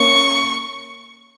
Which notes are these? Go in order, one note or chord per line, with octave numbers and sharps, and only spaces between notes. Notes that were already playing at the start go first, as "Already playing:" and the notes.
Already playing: A#3 C#4 C#6